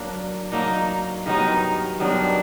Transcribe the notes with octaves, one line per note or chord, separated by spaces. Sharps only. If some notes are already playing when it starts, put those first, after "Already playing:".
Already playing: F#3 A#3 D4
F#3 A#3 D4 D#4
G2 D#3 F#3 B3 D#4
G2 D#3 F#3 B3 D4